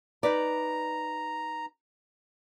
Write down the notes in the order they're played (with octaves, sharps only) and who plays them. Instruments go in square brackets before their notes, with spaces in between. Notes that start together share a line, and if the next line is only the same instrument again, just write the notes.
[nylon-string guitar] D#4 B4 D5 [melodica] A#5